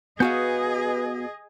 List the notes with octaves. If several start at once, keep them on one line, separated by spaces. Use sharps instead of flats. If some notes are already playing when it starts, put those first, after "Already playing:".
B3 F#4 G#4 B4 D#5 F5 G#5 G6